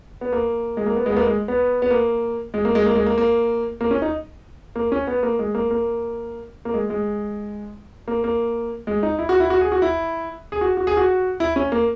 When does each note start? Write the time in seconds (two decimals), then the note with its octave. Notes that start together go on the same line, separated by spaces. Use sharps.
0.21 B3
0.32 A#3
0.77 G#3
0.86 A#3
0.96 B3
1.06 G#3
1.12 B3
1.17 A#3
1.27 G#3
1.48 B3
1.82 B3
1.91 A#3
2.54 G#3
2.65 A#3
2.75 G#3
2.86 A#3
2.96 G#3
3.07 A#3
3.18 A#3
3.81 A#3
3.91 C#4
4.02 D#4
4.76 A#3
4.92 C#4
5.07 B3
5.23 A#3
5.39 G#3
5.55 A#3
5.71 A#3
6.65 A#3
6.74 G#3
6.90 G#3
8.08 A#3
8.24 A#3
8.87 G#3
9.03 D#4
9.19 E4
9.29 F#4
9.40 E4
9.50 F#4
9.61 G#4
9.72 F#4
9.82 E4
10.52 G#4
10.61 F#4
10.77 F#4
10.87 G#4
10.97 F#4
11.40 E4
11.56 C#4
11.72 A#3